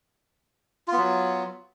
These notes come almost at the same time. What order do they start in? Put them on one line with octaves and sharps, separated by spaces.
F4 B3 F#3